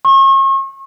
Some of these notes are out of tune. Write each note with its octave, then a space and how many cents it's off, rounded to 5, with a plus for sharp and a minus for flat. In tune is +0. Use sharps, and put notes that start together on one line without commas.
C#6 -40